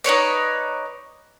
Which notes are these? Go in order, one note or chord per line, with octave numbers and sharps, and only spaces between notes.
D#4 B4 C#5 D5